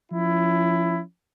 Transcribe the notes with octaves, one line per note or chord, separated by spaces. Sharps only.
F3 C#4 E4